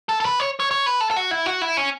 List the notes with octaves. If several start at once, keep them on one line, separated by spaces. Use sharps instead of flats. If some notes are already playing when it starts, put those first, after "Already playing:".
A4
A4
B4
C#5
C#5
C#5
B4
A4
A4
F#4
E4
F#4
E4
C#4